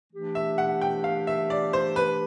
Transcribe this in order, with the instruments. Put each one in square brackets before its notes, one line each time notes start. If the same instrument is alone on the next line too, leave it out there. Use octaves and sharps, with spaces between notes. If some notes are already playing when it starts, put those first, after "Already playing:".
[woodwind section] E3 A3 D4 G4
[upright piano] E5
F#5
G5
F5
E5
D5
C5
B4